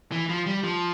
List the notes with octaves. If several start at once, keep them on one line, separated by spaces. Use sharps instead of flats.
E3
F3
G3
F3